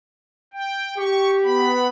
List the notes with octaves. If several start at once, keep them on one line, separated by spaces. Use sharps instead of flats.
G5
G4 C#6
B3 B5